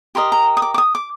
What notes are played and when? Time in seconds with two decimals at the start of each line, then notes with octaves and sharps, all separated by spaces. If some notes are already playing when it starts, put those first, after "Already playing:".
0.15 G4 A#4 D#5 C6
0.32 A#5
0.57 D#6
0.62 D6
0.74 D6
0.78 D#6
0.95 D6